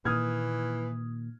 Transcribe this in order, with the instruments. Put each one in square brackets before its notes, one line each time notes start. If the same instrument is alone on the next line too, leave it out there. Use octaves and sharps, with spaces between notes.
[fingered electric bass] A#2 D#3 A#3 [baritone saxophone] E3 [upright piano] D#6 F6 G#6